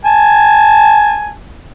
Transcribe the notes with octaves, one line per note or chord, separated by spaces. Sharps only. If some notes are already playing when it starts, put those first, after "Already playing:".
G#5 A5